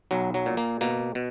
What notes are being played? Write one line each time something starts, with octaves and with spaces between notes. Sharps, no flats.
B1 F#3
F#3
A#2
A#3
B2 A#3
B2